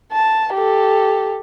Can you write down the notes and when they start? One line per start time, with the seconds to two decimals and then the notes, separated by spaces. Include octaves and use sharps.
0.12 A5
0.53 G4 A4